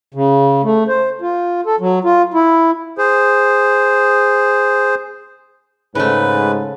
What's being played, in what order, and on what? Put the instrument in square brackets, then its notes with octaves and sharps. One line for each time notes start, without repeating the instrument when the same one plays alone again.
[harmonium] C#3
A3
C5
F4
A4
F#3
F4
E4
[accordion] G#4 C5
[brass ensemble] G#2 [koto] C#3 A3 [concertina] B4